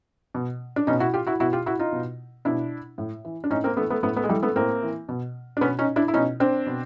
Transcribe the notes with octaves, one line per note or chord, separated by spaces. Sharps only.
B2
D4
B2 C#4 D#4
E4 F#4
F4 G4
E4 F#4
B2 E4 F#4
F4 G4
E4 F#4
D#4 F4
B2
B2 D4 E4
A2
E3
D4
A2 C#4 D#4
A#3 C4
E3 A3 B3
A3 B3
A2 A3 B3
A3 B3
G#3
E3 G3 A3
A3 B3
A2 A#3 C4
E3
B2
D4
B2 B3 C#4
C#4 D#4
D4 E4
E4
B2 C#4 D#4
C4 D4
B2